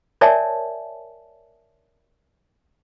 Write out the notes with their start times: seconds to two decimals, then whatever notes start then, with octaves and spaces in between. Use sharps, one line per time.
0.21 A#4 C#5 D5 E5 G#5 A5